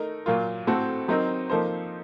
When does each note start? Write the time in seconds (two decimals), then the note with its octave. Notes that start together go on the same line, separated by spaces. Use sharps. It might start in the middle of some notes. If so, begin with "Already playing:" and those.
Already playing: A3 D#4 A#4
0.26 A#2 F#3 A#3 F4
0.67 A2 A3 C4 F#4 A4
1.08 F#3 C4 D#4 A#4
1.50 F3 A#3 D#4 A4 C5